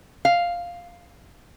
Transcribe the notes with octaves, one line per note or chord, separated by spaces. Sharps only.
F5